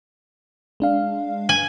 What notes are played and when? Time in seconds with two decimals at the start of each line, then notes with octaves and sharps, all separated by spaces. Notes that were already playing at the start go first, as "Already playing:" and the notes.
0.80 G#3 D4 F5
1.49 G#5